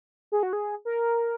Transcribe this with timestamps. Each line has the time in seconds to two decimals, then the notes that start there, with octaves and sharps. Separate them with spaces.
0.32 G#4
0.43 F#4
0.53 G#4
0.85 A#4